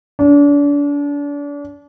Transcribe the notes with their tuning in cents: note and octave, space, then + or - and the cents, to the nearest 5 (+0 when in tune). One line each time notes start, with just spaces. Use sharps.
D4 -35